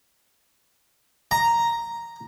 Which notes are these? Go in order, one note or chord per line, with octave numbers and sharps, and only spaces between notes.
A#5